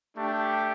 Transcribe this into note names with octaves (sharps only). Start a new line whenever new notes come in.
A3 D4 G4